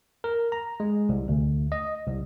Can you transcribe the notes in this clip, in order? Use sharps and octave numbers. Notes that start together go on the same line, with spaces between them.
A#4
A#5
G#3
C2
D2
D#5
C2